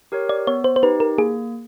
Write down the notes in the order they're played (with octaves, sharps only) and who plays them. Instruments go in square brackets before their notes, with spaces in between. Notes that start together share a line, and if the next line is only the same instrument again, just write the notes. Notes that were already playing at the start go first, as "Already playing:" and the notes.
[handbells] G4 A#4 C#5
[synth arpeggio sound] D5
[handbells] B3 [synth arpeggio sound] C#5
[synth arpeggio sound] C5
C5
[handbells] D#4 G4 [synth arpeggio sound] B4
[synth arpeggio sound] A#4
[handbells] A#3 [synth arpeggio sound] G#4